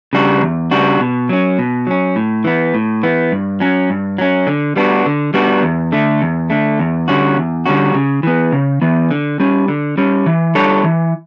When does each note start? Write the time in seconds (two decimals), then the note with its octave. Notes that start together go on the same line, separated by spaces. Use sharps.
0.13 C#3 G3 D4 F#4
0.42 E2
0.71 C#3 G3 D4 F#4
1.00 B2
1.29 F#3 C#4
1.59 B2
1.87 F#3 C#4
2.16 A2
2.44 E3 B3
2.74 A2
3.03 E3 B3
3.32 G2
3.60 F#3 C#4
3.90 G2
4.18 F#3 C#4
4.47 D3
4.76 G3 B3 D4 F#4
5.06 D3
5.34 G3 B3 D4 F#4
5.63 E2
5.92 D3 A3
6.22 E2
6.50 D3 A3
6.79 E2
7.08 D3 G3 C#4 F#4
7.37 E2
7.66 D3 G3 C#4 F#4
7.95 C#3
8.23 E3 B3
8.52 C#3
8.82 E3 B3
9.11 D3
9.40 G3 C#4
9.68 D3
9.98 G3 C#4
10.26 E3
10.55 G3 D4 A4 C#5
10.84 E3